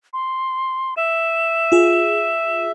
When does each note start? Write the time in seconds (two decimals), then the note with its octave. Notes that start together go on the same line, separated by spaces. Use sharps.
0.13 C6
0.97 E5 E7
1.72 F4 G#4